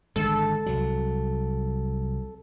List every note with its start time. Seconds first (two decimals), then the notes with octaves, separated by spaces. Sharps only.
0.16 G#1 D3 G#3 A4
0.66 C2 F#3